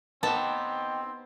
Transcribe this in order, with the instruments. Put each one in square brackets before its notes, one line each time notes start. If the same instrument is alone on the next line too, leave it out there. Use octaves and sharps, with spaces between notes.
[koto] B3 [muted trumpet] C4 [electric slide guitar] D#4 G4 [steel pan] A5